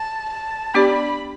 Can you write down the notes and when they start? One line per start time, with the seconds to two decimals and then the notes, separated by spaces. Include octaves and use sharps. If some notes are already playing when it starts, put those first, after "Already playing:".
Already playing: A5
0.30 A5
0.74 B3 D4 G4 D5 B5